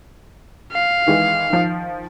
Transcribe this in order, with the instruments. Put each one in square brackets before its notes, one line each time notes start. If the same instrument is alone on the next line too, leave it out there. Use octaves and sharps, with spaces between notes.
[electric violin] F5
[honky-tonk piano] D#3 E3 G#3
D#3 F3